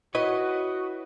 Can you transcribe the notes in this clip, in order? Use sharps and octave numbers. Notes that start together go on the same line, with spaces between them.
E4 F#4 B4 C#5 D#5